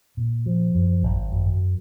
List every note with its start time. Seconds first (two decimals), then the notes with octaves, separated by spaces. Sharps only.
0.17 A#2
0.46 F3
0.75 F#2
1.03 G#1
1.32 F#2